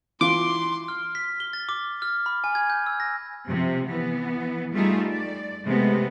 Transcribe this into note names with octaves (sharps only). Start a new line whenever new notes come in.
E3 F4 C6 D6
F6
B6
G7
A6
D6
F6
B5
G#5
G#6
G6
E6
A#6
C3 F3
E3 B3
G3 A3 D#4 F4 G#4
D5
C3 G#3 A3 B3